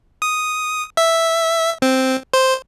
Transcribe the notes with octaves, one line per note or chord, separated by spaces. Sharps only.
D#6
E5
C4
C5